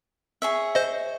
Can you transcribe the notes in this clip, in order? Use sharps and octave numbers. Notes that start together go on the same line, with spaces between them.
G#4 C#5 E5
C5 D#5